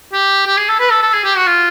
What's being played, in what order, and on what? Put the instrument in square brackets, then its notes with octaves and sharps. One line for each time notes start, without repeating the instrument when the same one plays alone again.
[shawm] G4
G4
G#4
A4
B4
A4
A4
G#4
G4
F#4
F4